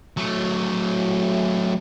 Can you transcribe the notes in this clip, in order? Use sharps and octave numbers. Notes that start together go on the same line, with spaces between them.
F#3 A3